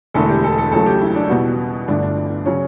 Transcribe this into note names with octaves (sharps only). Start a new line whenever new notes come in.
E1 E2 D3 A3 A4
G4
A4
A4
C#2 C#3 F#3 A3 A4
G4
E4
D4
E2 B2 G3 B3 F#4
G1 G2 D3 A3 D4
D4
C#3 F#3 C#4